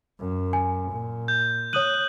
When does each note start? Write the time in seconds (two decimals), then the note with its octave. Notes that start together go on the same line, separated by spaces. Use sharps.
0.19 F#2
0.53 G#5
0.91 A#2
1.28 G6
1.73 C#5 D#6 F#6 D#7 F#7